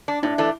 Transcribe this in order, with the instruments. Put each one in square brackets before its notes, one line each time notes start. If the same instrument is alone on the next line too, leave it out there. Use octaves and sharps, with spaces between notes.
[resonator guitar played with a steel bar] D4
[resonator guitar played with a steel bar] A2 [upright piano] D4
[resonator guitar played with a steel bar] E3 A3 D4 [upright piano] E4